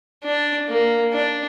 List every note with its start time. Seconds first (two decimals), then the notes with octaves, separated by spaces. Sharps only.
0.24 D4
0.68 A#3
1.13 D4